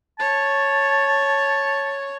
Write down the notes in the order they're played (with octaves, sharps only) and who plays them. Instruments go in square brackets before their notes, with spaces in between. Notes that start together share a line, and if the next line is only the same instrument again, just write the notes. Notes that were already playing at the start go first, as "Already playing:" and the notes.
[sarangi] C#5 [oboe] A5